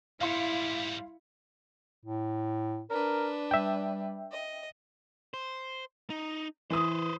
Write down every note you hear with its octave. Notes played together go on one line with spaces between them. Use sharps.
G#2 G3 E4 F5 C6 C#7
A2
D4 A#4 B4
G3 E5 G5
D#5
C5
D#4
E3 B4 C5 D#6